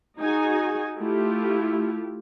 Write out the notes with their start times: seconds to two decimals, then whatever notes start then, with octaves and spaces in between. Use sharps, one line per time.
0.19 D#4 F#4 G#4 G#5
0.98 A3 E4 F4 G4